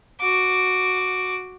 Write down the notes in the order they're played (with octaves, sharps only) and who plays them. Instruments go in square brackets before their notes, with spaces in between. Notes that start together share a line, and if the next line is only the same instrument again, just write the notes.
[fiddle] F#4 D6